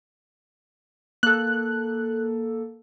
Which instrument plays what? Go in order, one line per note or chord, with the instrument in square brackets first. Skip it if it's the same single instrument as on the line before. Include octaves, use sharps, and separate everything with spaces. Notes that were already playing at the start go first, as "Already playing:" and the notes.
[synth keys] A#3 A4 [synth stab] F#6